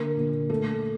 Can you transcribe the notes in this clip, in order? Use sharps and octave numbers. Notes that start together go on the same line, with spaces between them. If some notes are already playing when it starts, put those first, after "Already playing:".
Already playing: D3 A#3 A#4
A#2
A3 A4